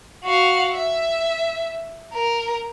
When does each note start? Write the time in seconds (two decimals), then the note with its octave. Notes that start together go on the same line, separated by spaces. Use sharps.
0.24 F#4 F5
0.73 E5
2.14 A#4